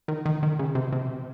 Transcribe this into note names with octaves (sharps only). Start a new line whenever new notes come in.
D#3
D#3
D#3
C#3
C3
C3